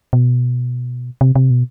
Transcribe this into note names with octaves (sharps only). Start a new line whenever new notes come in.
B2
C3
C3
B2